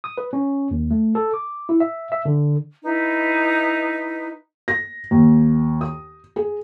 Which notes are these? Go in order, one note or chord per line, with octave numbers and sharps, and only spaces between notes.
D#6
B4
C#4
D#2
A3
A4
D6
E4
E5
E5
D3
D#4 E4 B4
A#6
D#2
D#6
G#4